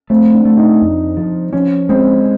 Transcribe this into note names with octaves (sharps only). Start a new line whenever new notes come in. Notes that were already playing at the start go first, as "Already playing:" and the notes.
A3 C4
D4
A3
D#4
F2
F3
F3 C#4
G#3 C4